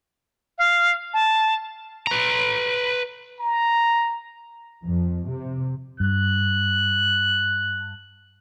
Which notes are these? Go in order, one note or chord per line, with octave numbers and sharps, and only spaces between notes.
F5
A5
B4 A#5
A#5
F2
C3
G2 F#6